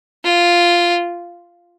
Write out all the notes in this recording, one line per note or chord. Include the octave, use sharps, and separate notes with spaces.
F4